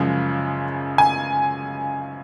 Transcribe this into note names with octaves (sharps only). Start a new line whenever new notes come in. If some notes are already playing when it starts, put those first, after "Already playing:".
Already playing: F#2 C#3 F3 G#3
G#5